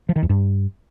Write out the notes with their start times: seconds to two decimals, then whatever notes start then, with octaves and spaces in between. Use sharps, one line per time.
0.09 F3
0.16 D#3
0.23 E2
0.29 G2